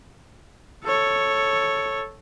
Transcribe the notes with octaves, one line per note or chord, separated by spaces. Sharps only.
A4 C#5